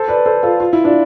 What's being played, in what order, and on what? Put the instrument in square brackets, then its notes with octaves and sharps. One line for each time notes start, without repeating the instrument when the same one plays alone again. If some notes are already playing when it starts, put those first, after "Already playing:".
Already playing: [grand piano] A4 C5
B4 D5
A4 C5
F4 A4
F4
E4
D4 F4